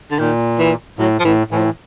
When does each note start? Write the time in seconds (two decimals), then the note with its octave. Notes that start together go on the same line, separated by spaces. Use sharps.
0.11 D3
0.19 A#2 D#3
0.59 E3
0.99 A2 F#3
1.20 F3
1.24 A2 E3
1.51 A2 E3
1.59 F3
1.65 E3